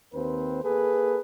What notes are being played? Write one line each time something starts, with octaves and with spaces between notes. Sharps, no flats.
D#2 C4 B4 C5
A#3 G#4 A4 B4